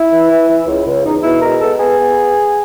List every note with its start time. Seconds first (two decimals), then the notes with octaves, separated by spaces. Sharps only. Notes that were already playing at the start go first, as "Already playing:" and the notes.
Already playing: E4
0.12 E3
0.30 E3
0.48 E3
0.67 C#2
0.87 C#2
1.05 E2 D#4
1.23 B2 E4
1.42 G#3 A#4
1.61 B3 A4
1.79 B3 G#4
1.99 B3